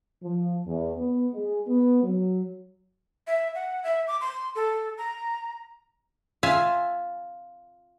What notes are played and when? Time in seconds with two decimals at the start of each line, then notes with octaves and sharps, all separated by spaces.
0.23 F3
0.66 E2
0.97 B3
1.34 G#3
1.67 B3
2.03 F#3
3.27 E5
3.55 F#5
3.84 E5
4.07 D6
4.21 C6
4.56 A4
4.98 A#5
6.43 F4 E5 G#5